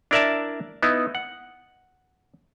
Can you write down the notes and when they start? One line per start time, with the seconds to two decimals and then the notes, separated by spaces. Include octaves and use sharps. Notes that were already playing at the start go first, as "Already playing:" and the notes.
0.11 D4 E4 A#4 D5 E5 A5
0.83 B3 D#4 E4
1.15 F#5